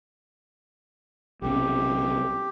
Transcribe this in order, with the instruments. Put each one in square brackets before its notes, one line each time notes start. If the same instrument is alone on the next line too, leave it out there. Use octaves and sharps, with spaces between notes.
[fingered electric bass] B1 C3 C#4 [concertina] G4